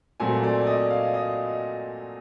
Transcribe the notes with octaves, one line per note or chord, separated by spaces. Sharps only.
A#2 F#3 A3 C4 G#5
D5
D5
D#5
F5
D#5